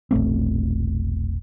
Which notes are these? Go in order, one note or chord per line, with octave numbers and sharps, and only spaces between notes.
E1 A#1 A3 C4